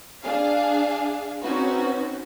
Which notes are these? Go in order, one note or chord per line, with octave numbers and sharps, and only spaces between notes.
D4 G#4 F5
C4 C#4 D#4 F#4 B4